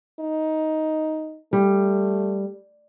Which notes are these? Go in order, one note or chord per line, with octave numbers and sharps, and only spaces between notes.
D#4
G3 A3